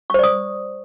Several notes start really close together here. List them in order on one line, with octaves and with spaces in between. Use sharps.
C#6 C5 D5 D#6